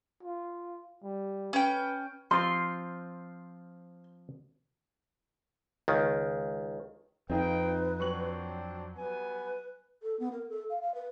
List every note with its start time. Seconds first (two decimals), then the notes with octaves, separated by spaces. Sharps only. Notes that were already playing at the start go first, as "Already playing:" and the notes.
0.23 F4
1.03 G3
1.53 C#4 B4 G5
2.31 F3 C4 F4 C6
5.88 C#2 D#3
7.30 F2 C4 D#4 F4 G#4 B4 G5
8.00 F#3 C4 D4 G5 C#6 F#7
8.97 G3 B3 B4 G#5
10.03 A4
10.20 B3
10.32 A#4
10.50 A4
10.69 F5
10.82 F5
10.95 B4